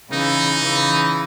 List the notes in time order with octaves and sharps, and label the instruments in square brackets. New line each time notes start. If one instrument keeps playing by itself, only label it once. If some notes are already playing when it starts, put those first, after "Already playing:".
[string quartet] C#3 E3 [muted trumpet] D#4
[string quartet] C#3 E3